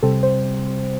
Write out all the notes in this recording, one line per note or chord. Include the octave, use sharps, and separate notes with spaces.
C3 G3 C4 A4
C5